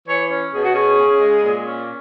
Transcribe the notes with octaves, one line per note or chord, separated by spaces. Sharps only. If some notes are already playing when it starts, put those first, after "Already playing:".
E3 C#5
C#4
B2 G#4
F#4
C#4 G#4
C#3
G#3
A#2
C#4